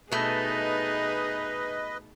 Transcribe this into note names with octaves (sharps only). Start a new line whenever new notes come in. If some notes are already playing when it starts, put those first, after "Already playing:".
B2 A3 D#4 G#4 B4 D#5